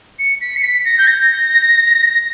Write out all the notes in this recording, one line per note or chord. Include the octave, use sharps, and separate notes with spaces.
C#7
B6
C#7
B6
A#6
G6
A#6